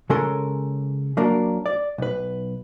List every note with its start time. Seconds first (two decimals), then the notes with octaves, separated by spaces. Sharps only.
0.10 C#3 G#3 C#4 A4 A#4 C6
1.17 F#3 A#3 D4 A#4
1.66 D5
1.98 B1 B4